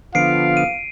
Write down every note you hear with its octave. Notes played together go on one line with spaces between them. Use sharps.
D3 F3 B3 F4 F5 C7 D7
D#7